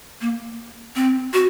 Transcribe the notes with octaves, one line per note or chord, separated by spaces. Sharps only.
A#3
C4
F#4